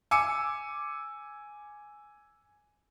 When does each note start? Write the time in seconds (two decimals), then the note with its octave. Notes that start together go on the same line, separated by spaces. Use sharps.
0.11 G#5 D6 E6 C#7